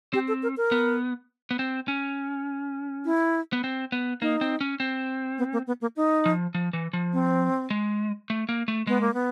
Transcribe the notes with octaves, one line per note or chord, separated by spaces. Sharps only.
C4 G4
A4
A#4
A#4
B3
B3
C4
C#4
E4
B3
C4
B3
A#3 D#4
C4
C#4
C4
B3
A#3
B3
A#3
D#4
F3
F3
E3
F3
C4
G#3
A3
A#3
A3
G#3 B3
A#3
B3